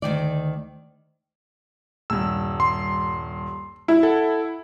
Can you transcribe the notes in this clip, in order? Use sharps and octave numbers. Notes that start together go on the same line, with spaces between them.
D2 B2 D#3 D5
D#1 G2 E6
C6
E4
A4 F#5